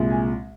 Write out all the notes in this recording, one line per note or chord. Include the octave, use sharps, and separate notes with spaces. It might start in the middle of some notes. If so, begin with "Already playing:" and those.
Already playing: C2 A#2 G#3
G#5